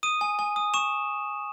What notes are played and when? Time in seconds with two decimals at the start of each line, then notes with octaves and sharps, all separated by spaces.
0.03 D#6 D#7
0.21 G#5
0.39 G#5
0.56 D#6
0.74 C#6 E7